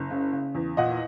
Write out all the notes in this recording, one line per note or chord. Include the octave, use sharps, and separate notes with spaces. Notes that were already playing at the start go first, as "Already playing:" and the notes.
Already playing: F#1
C#3
C#3
E2
A#2 D#5 F#5